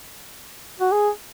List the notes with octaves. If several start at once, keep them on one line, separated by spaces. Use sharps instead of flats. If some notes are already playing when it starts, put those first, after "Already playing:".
F#4
G#4